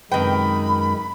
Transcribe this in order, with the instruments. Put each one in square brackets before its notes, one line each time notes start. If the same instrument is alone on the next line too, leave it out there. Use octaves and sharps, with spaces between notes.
[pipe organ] F#2 G#3 D#4 [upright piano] C3 B4 [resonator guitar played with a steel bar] D#3 G5 [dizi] B5